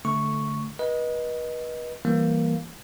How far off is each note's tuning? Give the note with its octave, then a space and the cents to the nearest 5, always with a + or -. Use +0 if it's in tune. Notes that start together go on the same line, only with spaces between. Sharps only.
D3 +0 A3 -10 C#6 +0
B4 -35 D#5 +0
E3 +15 G3 +0 A#3 +0